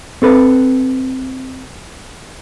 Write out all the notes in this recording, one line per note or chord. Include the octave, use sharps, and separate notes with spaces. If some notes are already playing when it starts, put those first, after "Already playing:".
C4 A4 B4